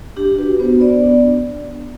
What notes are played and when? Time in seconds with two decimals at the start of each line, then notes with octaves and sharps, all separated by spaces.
0.16 D4 G4
0.38 F#4 B4
0.59 B3 C5
0.81 B3 D5
1.03 D4